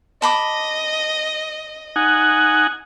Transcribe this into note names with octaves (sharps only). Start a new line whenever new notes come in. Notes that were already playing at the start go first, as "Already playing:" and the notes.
D#5 A5 B5 D6
D#4 F#5 G#5